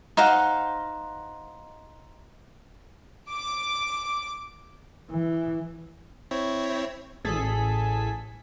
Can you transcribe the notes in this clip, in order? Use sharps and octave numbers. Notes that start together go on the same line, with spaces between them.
D#4 C5 F5 F#5
D6
E3
C4 E4 C#5
A1 G#4 A4 B6